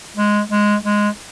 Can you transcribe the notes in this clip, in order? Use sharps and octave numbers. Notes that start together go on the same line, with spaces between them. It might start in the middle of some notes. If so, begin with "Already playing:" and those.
G#3
G#3
G#3